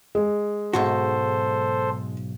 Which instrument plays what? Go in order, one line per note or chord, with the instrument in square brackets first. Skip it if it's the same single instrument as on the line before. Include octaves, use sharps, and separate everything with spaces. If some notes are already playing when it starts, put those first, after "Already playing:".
[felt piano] G#3
[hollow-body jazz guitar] B1 G#2 F#4 [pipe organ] A4 C5